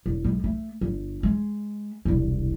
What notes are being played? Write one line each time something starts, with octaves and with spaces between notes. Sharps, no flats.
E1
B1 G#3
A3
G1
G#3
E1 C2